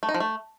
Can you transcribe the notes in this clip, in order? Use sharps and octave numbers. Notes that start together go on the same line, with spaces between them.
A3
D#4
F3
A3